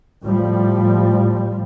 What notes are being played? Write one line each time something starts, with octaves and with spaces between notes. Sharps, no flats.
A2 F3 G3